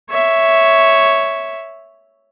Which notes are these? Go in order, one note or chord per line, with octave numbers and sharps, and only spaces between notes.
C#5 E5